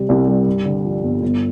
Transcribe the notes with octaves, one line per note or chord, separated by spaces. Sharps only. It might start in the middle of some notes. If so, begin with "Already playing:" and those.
Already playing: C3 G3
C2
G3
G2
D3
F3
G1
G1